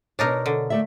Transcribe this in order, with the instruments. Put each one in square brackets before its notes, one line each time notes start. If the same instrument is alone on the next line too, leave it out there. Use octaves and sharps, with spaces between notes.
[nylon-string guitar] B2 C#5 [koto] D4 D#4 A#4
[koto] D3
[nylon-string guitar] A3 D5 E5